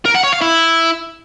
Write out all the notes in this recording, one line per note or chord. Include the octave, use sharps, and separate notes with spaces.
A#4
F#5
C#5
F5
E4